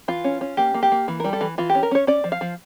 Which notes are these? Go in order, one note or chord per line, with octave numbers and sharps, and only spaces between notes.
E3 F4
C#4
C#4
A#3 G4
A#3
G4
A#3
E3
G3 A#4
A4
E3
E3 F4
G4
C#4
A#4
C#4 C#5
C#4 D5
F3
F5
F3